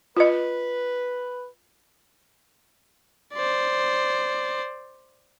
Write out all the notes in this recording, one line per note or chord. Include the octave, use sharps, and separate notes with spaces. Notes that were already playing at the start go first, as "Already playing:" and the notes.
F4 B4 D#5
C5 D5